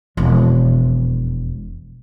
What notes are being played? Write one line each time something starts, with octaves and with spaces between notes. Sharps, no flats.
E1 F2